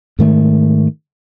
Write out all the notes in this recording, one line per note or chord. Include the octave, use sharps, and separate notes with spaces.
G#2 D#3 A3